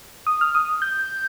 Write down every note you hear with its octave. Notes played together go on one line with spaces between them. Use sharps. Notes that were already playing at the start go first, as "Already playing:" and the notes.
D#6
F6
D#6
G6